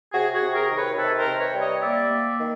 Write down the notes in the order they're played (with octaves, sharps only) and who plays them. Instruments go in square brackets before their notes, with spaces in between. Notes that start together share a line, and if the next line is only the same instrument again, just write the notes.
[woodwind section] C3 F#4 G#4
F#4 G#4
C3
G#4 A#4
D#3
B4 C#5
C3 A4 B4
A#4 C5
C3
B4 C#5
G3
C#5 D#5
A#3 D5 E5
A#3
D#3